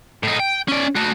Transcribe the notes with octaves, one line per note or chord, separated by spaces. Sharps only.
A2 D#4
G5
C#4 D5
A3 F#4